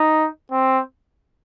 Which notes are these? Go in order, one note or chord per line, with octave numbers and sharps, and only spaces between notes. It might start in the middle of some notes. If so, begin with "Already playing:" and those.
Already playing: D#4
C4